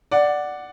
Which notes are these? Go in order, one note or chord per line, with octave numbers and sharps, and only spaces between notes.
D5 F#5